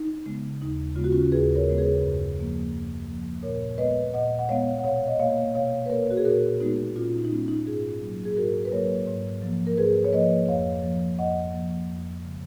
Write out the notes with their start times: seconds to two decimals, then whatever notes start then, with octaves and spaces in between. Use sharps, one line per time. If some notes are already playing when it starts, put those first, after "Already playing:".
Already playing: D#4
0.26 C#3 G#3 B3
0.61 D#2 D#4
0.96 C#3 G#3 B3 F4
1.04 F#4
1.12 C#4 F4
1.32 D#2 G#4 B4
1.55 A#4 C#5
1.67 C#3 G#3 B3
1.78 G#4 B4
2.02 F#2
2.38 F3 A#3
2.72 F#2
3.08 F3 A#3
3.43 A#2 A#4 C#5
3.78 G#3 B3 B4 D#5
4.14 A#2 D#5 F#5
4.39 F#5
4.49 G#3 B3 C#5 F5
4.79 F#5
4.84 B2 C#5 F5
5.07 D#5
5.19 A#3 C#5 F5
5.55 B2 C#5 F5
5.86 B4
5.89 A#3 A#4 C#5
6.10 F#4
6.17 G#4
6.25 A#2 F#4 A#4
6.60 G#3 B3 D#4 F#4
6.96 A#2 C#4 F4
7.13 D#4
7.25 D#4
7.31 G#3 B3 C#4
7.48 D#4
7.66 G#2 F4 G#4
8.02 F#3 A#3
8.25 G#4
8.36 G#2 F#4 A#4
8.65 B4
8.72 F#3 A#3 A#4 C#5
9.07 G#2
9.42 F3 A#3
9.67 A#4
9.77 G#2 G#4 B4
10.05 C#5
10.13 F3 A#3 B4 D#5
10.48 F2 C#5 F5
10.83 F3 A#3
11.19 F2 D#5 F#5
11.53 F3 A#3
11.89 F2
12.24 C#3 G#3